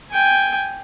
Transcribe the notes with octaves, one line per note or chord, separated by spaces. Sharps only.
G5 G#5